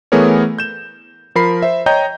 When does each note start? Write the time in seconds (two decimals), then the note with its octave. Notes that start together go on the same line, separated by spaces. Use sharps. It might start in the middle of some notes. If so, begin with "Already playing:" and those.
0.12 E3 A3 B3 G#4 A#4 C#5
0.59 G6 E7
1.35 F3 A#4 B5 C7
1.62 C5 E5
1.86 C#5 D#5 G5 A#5 G6